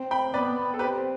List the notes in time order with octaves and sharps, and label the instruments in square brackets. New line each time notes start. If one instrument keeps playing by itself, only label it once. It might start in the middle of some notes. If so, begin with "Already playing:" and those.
Already playing: [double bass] C4
[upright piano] G5 B5
[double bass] B3 [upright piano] B4 D5
[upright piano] A4
[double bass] C4 [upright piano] G4 B4